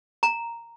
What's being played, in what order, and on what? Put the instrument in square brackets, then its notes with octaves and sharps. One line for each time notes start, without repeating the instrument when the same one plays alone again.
[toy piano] A#5